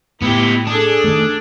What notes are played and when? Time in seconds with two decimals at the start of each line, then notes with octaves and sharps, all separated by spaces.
0.22 A2 B3 E4 G4
0.67 D4 G#4 A4
1.04 D#3 A3